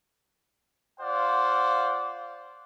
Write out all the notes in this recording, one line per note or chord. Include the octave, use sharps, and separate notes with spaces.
F4 C5 D5 F5 F#5